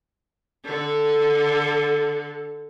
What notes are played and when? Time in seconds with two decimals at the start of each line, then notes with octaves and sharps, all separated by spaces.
0.65 D3 A4